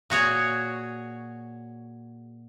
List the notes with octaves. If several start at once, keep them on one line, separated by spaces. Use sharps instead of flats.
A#2 F#4 G#4 C#5